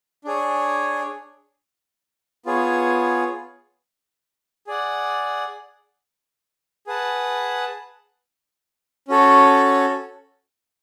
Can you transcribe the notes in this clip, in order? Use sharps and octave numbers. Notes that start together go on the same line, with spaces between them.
D4 G#4 C#5
B3 F4 G#4 C#5
G#4 D5 F#5
G#4 B4 F#5 A5
C#4 F#4 A4 C#5